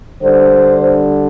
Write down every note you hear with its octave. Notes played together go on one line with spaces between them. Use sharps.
D3 G3 D4 C5